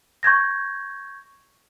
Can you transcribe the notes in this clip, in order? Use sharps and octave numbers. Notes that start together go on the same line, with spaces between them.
C#6 G6 G#6 A#6